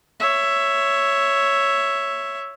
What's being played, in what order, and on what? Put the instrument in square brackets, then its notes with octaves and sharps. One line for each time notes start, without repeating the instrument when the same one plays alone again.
[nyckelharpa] C#5 E5